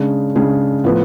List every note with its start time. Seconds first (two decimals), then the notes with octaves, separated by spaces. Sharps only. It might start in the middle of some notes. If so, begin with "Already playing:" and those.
Already playing: C#3 G#3 D4 G#4
0.35 C#3 G#3 D4 G#4
0.84 A2 F3 B3